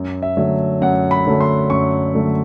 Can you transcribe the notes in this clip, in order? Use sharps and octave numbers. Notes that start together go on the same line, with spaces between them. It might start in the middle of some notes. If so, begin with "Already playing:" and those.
Already playing: F#2
E5
D3 F#3 A3
F#2 F#5
B5
D3 F#3 A3
C6
F#2 C#6
D3 F#3 A3